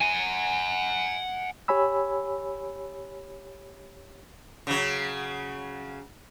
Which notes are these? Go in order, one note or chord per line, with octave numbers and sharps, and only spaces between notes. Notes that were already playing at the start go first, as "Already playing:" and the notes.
F#5 G#5
G4 C#5 G#5 B5 E6
C#3 F#3